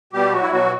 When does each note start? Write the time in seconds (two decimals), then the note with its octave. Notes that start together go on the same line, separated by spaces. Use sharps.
0.13 B2 G3 G4
0.32 F#3 F#4
0.42 E4
0.50 B2 F#3 F#4